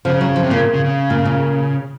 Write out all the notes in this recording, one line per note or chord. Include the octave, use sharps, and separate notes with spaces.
C#3 F3
F#3
F3
C3
A#2 C#3
C#3
C#3
A#2
A#2